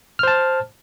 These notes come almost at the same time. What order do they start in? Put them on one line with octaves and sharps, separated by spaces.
F6 C5 A5